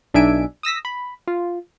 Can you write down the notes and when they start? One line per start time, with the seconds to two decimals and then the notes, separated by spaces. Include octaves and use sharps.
0.14 B1 D4 D#4 E5 G#5 D7
0.63 D#6 E6 A#6 B6
0.85 B5
1.27 F4